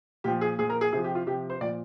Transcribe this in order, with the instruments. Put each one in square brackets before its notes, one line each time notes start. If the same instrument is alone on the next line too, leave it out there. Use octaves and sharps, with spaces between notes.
[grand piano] A#2 F3 G4
G#4
A#2 F3 G#4
A#4
G#4
C3 F3 G#4
G4
F4
C3 F3 G4
C5
A#2 F3 D5